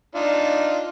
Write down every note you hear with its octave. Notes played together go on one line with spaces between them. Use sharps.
D4 D#4 F4